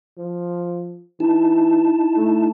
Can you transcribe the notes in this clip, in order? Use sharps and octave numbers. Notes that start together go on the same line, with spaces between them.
F3
E3 D#4 E4 A5
A3